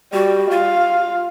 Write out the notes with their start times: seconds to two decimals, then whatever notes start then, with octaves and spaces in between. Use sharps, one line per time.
0.13 G3 F#4
0.51 F4 F5